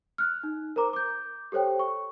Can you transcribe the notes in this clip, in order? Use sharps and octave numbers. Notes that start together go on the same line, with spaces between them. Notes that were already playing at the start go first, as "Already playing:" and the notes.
F6 F#6
D#4
A#4 C5 A#5 D6
D6 G6
G4 A4 C5 C#5 G5
C#6